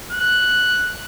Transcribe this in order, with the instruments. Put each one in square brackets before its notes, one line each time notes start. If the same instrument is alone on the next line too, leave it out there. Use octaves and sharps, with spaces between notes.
[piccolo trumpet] F#6